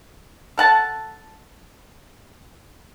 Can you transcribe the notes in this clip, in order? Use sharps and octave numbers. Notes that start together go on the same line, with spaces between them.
A4 F#5 A5